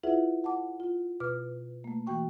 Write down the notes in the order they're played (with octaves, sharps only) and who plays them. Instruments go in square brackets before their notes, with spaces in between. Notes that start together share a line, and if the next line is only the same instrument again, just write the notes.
[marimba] E4 F4 G#4 B4 E5 F#5
F#5 A5 D6
F4
B2 B4 D6 F6
A3 A#3
E3 A#3 F#4 G5 C#6